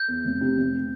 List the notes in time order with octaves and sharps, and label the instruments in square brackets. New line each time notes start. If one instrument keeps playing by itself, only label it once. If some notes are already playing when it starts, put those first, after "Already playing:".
Already playing: [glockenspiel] G6
[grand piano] E2
F1
C3
F1